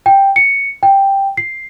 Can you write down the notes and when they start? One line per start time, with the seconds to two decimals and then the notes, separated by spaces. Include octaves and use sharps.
0.06 G5
0.36 C#7
0.83 G5
1.37 C7